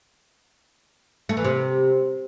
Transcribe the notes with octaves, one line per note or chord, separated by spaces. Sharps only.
A3
E3
C3